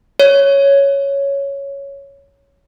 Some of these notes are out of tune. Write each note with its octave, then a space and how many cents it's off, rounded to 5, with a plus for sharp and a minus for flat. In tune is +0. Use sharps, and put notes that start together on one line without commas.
C#5 +5